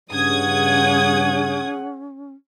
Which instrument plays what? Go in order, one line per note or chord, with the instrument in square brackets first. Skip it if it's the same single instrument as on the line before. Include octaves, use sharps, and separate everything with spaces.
[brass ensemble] G2 C#3 [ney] C#4 [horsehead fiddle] G#4 F#5 [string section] D#6 G#6